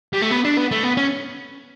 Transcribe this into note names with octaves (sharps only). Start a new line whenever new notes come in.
G3
A3
B3
D4
B3
A3
B3
C#4